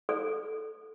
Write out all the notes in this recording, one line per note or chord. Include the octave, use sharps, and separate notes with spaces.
A4